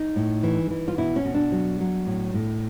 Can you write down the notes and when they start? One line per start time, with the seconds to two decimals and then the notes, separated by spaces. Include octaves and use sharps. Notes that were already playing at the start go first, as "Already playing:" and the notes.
Already playing: D#4
0.16 A2
0.43 E3
0.70 E3
0.88 F4
0.98 B2 E4
1.16 C#4
1.25 B2
1.34 D4
1.52 F#3
1.80 F#3
2.06 A2
2.34 A2